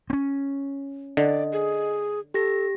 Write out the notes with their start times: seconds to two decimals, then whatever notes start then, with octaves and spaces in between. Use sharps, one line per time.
0.10 C4 C#4
1.17 D3 D5 D#5
1.52 G#4
2.34 G4 A4 A#6